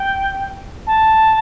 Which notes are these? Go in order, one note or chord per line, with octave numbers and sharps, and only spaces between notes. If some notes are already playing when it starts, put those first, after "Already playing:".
Already playing: G5
A5